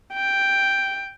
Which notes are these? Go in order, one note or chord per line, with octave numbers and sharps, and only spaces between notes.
G5